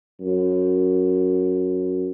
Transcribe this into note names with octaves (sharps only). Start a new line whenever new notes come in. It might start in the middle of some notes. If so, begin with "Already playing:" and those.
F#2